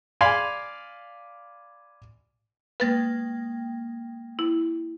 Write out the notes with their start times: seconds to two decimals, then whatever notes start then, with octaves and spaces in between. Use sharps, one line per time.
0.21 D5 F5 G#5 B5 C6
2.80 G#3 A#3 B4 G5 A6
4.39 E4